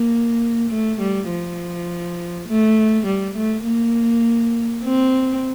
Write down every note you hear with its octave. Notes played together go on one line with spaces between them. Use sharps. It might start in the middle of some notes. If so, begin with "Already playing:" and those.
Already playing: A#3
A3
G3
F3
A3
G3
A3
A#3
C4